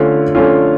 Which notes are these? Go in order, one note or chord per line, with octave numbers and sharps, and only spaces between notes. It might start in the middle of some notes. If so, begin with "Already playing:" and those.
Already playing: D3 A3 C#4 F4
D3 A3 C#4 F4